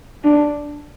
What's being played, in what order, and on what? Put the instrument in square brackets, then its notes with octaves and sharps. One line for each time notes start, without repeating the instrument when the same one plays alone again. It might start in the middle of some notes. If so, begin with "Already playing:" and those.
[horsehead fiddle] D4